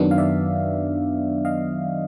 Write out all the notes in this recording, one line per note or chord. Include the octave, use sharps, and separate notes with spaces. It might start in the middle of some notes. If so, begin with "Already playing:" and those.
Already playing: F#2 D#3 F#3 B3 D4
F5
D5 E5
D#5 F5